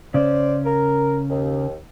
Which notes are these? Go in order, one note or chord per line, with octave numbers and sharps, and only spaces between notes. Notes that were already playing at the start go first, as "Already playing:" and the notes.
C#3 C#4 C5 D5
A#4
D#2